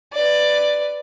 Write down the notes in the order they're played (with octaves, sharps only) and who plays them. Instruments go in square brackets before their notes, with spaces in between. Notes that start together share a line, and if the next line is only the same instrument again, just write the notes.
[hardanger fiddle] B4 D5